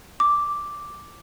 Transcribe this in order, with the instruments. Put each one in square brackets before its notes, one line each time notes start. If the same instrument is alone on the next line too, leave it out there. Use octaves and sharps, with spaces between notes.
[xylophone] D6